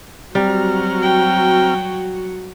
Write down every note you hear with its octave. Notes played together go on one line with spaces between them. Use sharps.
F#3 G3 C4 F#4 A#5 F6
G5